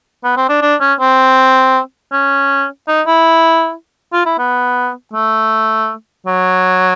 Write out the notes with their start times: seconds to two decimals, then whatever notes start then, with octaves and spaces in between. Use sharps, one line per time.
0.24 B3
0.37 C4
0.49 D4
0.62 D4
0.80 C#4
1.00 C4
2.12 C#4
2.88 D#4
3.07 E4
4.13 F4
4.26 E4
4.39 B3
5.13 A3
6.27 F#3